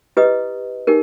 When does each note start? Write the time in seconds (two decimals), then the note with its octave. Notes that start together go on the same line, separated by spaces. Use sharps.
0.17 E4 G4 B4 D#5 D#6
0.87 D#4 G4 A#4